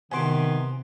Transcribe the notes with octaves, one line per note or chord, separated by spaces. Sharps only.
C3 D#3 E3 B3 G#5 C6 D6